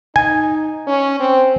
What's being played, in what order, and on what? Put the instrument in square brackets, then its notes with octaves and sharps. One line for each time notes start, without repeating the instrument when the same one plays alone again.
[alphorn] D#4 [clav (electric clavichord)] G#5
[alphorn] C#4
C4